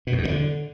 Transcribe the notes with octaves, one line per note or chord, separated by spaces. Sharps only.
B2
F#2
E2
A2
D3